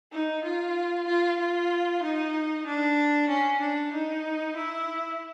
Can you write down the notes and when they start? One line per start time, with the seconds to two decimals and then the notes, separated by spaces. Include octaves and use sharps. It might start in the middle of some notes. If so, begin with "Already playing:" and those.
0.12 D#4
0.44 F4
1.07 F4
1.39 F4
2.03 D#4
2.66 D4
3.29 C#4
3.61 D4
3.93 D#4
4.56 E4